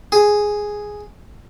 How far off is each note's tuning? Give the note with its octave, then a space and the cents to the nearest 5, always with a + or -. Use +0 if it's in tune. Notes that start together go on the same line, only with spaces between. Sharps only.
G#4 +0